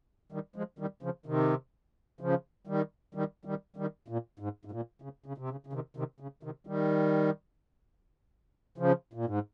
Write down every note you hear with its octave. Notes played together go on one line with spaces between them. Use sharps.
D#3 G3
F3 G#3
D#3 G3
C#3 F3
C3 D#3
C#3 F3
D#3 G3
D#3 G3
D#3 G3
D#3 G3
A#2
G#2
G#2
A#2
C#3
C#3
C3
C#3
C#3
C3 D#3
C3 D#3
C#3
C3 D#3
D#3 G3
C#3 F3
A#2
G#2